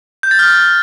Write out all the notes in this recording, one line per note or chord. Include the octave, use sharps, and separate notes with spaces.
G6
A6
F6